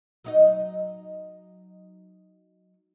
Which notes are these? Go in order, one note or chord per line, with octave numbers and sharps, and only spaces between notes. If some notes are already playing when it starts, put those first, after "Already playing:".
F#3 D#4 D#5